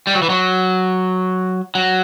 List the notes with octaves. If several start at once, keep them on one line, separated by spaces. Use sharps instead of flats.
G3
F#3
E3
F#3
F#3